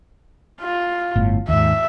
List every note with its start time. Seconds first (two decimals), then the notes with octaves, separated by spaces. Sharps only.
0.61 F4
1.16 G1 A2
1.48 D#2 G#2 E5